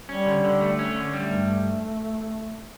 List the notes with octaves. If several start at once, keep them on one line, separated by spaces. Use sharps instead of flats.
G3 C#4
D3
D3
A3
C#4
D3
G3 A3
G2